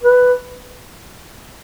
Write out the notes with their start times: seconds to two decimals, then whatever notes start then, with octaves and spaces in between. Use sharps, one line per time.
0.03 B4